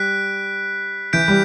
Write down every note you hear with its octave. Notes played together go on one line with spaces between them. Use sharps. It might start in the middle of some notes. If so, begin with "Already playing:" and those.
Already playing: G3 F#6 B6 D7
E3 G6 B6 D7
G3